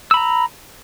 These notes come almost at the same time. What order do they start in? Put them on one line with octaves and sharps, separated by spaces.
E6 B5 A#5